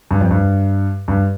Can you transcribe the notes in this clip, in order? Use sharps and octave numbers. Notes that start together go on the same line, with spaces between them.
G2
F2
G2
G2